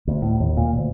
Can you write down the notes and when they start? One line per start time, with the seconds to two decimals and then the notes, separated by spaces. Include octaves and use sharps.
0.07 D2
0.22 A2
0.40 D#2
0.57 A#2
0.77 D2